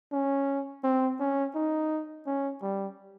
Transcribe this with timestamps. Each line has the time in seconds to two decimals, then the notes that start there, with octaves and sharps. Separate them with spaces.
0.12 C#4
0.84 C4
1.20 C#4
1.55 D#4
2.27 C#4
2.62 G3